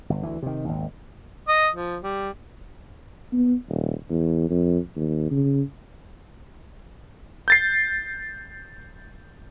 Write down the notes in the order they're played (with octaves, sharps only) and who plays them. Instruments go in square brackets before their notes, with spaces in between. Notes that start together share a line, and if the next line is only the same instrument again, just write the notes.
[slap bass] G1
D2 E3
C3 D#3
G#1 D#2
[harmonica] D#5
F3
G3
[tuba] B3
D#1
E2
F2
D#2
C#3
[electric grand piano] G6 A6 C7